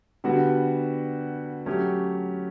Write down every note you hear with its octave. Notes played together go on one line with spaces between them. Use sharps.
D3 G3 B3 F#4
F#3 A3 C#4 G4